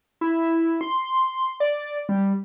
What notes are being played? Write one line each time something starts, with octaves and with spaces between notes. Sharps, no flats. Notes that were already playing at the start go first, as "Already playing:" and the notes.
E4
C6
D5
G3